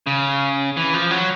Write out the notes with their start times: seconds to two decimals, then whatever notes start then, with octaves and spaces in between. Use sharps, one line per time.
0.07 C#3
0.77 E3
0.94 F3
1.11 F#3